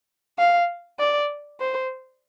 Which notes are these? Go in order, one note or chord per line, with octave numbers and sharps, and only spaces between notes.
F5
D5
C5